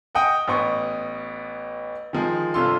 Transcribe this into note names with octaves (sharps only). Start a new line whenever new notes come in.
D#5 F#5 G5 D#6
A1 B3 C#6
D#3 F3 G#3
G1 C3 F4 A4 C6